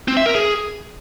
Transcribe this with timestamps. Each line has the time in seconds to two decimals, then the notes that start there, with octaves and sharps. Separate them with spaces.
0.08 C4
0.17 E5
0.26 A#4
0.35 G#4